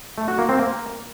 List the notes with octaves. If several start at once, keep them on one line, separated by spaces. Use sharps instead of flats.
A3
F#4
A#3
C4
A#3